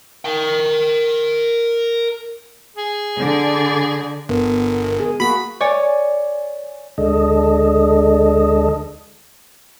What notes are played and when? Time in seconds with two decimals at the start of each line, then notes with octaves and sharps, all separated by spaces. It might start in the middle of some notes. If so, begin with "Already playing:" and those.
0.25 A#4 G5
2.76 G#4
3.17 D3 D5
4.29 G1 B3 A#4
5.00 G#4
5.20 A#3 F#4 B5 B6
5.61 C#5 D5 G#5
6.98 D2 G#3 D4 A4 D#5